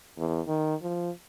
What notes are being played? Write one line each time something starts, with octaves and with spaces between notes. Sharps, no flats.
E2
D#3
F3